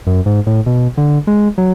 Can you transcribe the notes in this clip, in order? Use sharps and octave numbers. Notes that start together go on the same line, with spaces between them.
F#2
G#2
A2
B2
D3
G#3
F#3